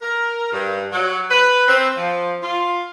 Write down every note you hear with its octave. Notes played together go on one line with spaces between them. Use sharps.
A#4
G2
F#3
B4
C4
F3
F4